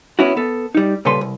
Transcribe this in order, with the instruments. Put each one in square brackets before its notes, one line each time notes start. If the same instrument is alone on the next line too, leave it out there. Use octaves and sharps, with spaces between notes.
[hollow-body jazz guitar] B3 C#4 E4 F#4
B3 A4
G3 D#4
A#2 C#3 G3 A4 B4 C6
C2